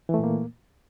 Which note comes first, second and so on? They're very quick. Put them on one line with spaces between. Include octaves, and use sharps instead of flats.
E3 A3 A#2 A#3